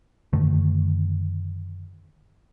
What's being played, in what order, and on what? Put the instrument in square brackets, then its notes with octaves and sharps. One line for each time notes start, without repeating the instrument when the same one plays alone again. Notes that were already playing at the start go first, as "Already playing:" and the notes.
[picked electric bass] F#2 D3 D#3 A3